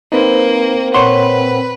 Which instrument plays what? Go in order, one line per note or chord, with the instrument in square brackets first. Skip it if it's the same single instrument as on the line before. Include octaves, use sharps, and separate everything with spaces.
[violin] A#3 [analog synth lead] C4 [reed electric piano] D#4 B4 C5
[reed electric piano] A#2 A#4 F#5 [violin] B4 [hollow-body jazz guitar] C#5 C6